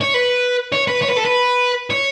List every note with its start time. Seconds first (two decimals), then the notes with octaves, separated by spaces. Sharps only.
0.01 C#5
0.14 B4
0.73 C#5
0.88 B4
1.02 C#5
1.09 B4
1.17 A4
1.25 B4
1.90 C#5